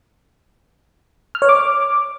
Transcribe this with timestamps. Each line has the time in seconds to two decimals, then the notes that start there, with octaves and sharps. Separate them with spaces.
1.35 F6
1.42 C#5
1.49 D6